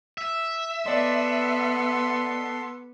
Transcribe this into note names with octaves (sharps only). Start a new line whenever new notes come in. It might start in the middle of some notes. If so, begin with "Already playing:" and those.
E5
B3 A4 D5 D#5 C6